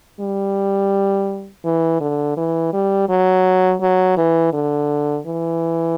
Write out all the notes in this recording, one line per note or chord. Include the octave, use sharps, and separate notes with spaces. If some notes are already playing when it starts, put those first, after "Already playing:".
G3
E3
D3
E3
G3
F#3
F#3
E3
D3
E3